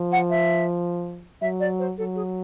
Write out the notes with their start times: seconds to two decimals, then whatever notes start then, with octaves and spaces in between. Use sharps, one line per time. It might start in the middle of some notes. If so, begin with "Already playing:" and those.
Already playing: F3
0.12 F#5
0.30 E5
1.42 F#3 E5
1.60 D5
1.79 C5
1.98 F#3 A4
2.16 G#4